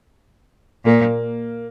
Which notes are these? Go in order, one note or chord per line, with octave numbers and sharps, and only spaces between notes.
A#2 A#3